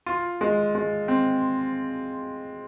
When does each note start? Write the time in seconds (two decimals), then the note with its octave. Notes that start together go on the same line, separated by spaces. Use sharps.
0.06 F4
0.41 G#3
0.75 G#3
1.08 C4